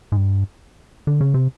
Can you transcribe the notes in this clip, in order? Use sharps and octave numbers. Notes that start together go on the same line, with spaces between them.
G#2
G2
D3
C#3
C3